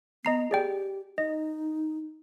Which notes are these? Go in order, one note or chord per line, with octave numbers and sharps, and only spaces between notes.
B3 D#5 A#5 C7
G4 G#4 D5 G5
D#4 D#5